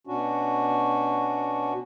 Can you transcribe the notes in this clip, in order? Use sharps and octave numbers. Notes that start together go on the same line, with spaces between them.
B2 C#4 D4 F#4